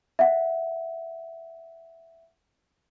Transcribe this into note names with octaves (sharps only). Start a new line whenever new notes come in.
E5 F#5